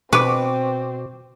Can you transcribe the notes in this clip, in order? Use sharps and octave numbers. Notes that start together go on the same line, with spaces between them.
B2 C4 B4 C#6 D6